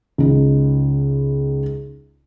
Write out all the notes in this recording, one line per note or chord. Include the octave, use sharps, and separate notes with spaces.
C#2 D#4